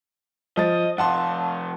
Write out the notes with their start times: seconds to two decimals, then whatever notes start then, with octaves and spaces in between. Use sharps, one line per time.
0.57 F3 D#5 A6
0.98 C3 F3 F#5 A5 C6